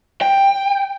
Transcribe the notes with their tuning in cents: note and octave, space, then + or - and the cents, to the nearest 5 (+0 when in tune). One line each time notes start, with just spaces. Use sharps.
G5 +5